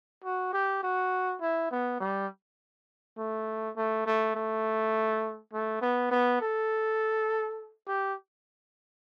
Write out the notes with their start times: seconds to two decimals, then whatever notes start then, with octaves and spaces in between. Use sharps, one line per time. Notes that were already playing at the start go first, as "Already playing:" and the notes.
0.24 F#4
0.53 G4
0.83 F#4
1.41 E4
1.71 B3
2.00 G3
3.18 A3
3.76 A3
4.06 A3
4.35 A3
5.53 A3
5.82 B3
6.11 B3
6.41 A4
7.88 G4